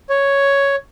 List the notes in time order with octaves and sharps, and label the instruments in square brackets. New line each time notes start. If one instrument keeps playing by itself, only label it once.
[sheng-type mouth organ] C#5